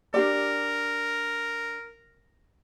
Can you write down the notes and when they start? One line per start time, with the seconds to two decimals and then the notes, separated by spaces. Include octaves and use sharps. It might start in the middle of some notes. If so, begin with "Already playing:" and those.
0.14 D4 G4 A#4 D5